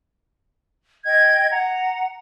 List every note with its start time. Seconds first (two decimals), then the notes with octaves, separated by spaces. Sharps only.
1.04 D#5 G5 G#6
1.50 F#5 A#5